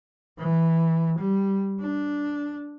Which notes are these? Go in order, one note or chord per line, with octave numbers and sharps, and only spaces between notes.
E3
G3
D4